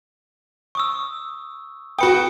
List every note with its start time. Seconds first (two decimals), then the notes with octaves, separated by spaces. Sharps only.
0.75 C#6 D#6 E6
1.99 F#4 B4 G5 D#6 C#7